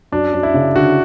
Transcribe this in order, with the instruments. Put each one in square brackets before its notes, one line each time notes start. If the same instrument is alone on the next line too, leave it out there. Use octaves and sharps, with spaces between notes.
[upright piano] F#2 [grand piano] D4
[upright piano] F#2
[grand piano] E4
[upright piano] C#3
[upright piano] D3 [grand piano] F#4